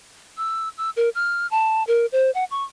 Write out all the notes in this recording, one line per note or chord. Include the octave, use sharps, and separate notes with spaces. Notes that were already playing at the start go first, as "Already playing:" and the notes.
E6
E6
A#4
F6
A5
A#4
C5
F#5
C#6